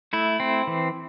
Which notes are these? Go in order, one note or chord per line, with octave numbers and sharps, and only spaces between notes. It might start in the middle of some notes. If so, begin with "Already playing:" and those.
A3 E4
C4
E3